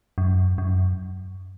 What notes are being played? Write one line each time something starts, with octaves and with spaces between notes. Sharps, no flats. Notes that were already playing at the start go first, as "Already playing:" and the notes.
F#2
F#2